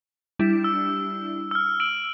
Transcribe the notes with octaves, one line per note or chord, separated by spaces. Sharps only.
G3 D4 E4
E6
E6 F6
E6 D7 F#7